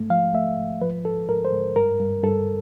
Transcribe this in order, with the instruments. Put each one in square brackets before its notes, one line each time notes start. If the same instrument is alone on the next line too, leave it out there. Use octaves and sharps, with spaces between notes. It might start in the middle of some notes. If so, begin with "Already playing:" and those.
Already playing: [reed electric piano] G#2 A3
F3 F5
A3 E5
G#2
F3 B4
G#2 A4
G#2 A#4
C5
G#2
G2 A#4
G2
G2 A4